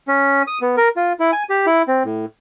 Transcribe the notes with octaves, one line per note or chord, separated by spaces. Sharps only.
C#4
D#6
B3
A#4
F4
E4
G#5
G4
E4
C4
A2